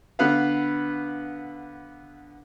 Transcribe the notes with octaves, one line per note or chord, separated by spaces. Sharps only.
D3 B3 B4 F5